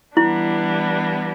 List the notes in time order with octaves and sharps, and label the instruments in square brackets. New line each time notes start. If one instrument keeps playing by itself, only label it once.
[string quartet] E3 G3 B3 D4 [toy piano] E4